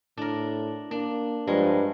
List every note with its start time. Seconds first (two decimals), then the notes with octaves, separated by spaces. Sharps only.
0.17 A2 D4 A#4
0.91 A#3 D4
1.47 G2 F3 G#3 A#4